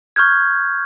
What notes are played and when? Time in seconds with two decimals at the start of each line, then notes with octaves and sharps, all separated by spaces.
0.16 C#6 F6 G6 G#6